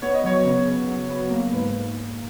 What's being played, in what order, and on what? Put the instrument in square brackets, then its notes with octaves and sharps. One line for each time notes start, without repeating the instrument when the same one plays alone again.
[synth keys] B3 [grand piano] C#5
[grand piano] D#5
[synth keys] F#3 [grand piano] C#5
[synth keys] C#3
C#3
F#3
B3
A#3
[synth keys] G#2 [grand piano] B4